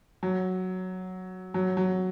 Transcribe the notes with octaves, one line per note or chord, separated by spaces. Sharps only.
F#3
F#3
F#3